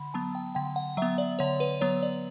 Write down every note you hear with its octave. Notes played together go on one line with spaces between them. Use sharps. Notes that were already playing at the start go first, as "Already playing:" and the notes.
Already playing: D3 B5
F#3 B3 A5
G5
D3 G5
F#5
F#3 B3 E5
D5
D3 C#5
B4
F#3 B3 C#5
D5